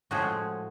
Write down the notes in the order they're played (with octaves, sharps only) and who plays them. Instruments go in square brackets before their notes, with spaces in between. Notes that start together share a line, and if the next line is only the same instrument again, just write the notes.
[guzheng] A2 F3 G#3 F#4 G#4